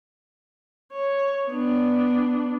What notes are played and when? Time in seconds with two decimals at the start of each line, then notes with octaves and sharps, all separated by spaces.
0.93 C#5
1.50 B3 D4